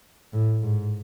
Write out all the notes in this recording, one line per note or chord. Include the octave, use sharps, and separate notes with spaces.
A2
G#2